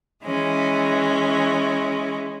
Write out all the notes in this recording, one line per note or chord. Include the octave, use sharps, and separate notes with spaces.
E3 G#3 C#4